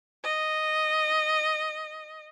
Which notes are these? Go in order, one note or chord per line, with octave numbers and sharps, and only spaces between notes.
D#5